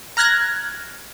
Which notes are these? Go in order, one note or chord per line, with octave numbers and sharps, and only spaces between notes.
A#5 F6 F#6 G#6 A#6